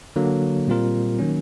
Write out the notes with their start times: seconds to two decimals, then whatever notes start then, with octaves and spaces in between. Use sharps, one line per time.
0.16 D3 F#3 A#3
0.68 A#2 G3 C4 F4 A#4
1.19 D#3 F#3 A#3 C#4